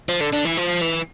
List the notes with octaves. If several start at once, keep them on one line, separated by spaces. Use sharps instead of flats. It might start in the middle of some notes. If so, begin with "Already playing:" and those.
F3
D3
D3
E3
F3
E3